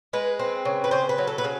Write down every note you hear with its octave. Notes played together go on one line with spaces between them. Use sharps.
G#3 B4
C4
C#3
B4
C#3 C5
B4
F#3
A4
B4
C#3